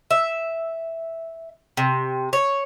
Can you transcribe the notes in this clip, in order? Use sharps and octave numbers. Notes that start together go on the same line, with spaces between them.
E5
C3
C#5